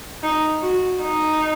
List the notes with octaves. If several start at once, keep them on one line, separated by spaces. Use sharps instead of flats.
D#4
F#4
D#4